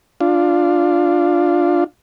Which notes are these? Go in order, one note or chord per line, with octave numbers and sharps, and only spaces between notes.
D4 F4